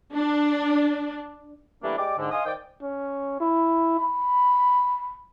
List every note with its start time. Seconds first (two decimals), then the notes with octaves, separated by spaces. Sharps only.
0.14 D4
1.83 E3 G3 A3 A#3 D4 B4
1.97 G#3 G4 D5 D6
2.18 G#2 D3
2.31 D#5 F5 G#5 C6 D#6
2.46 D#3 C5 D5 G5
2.82 C#4
3.40 E4
3.99 B5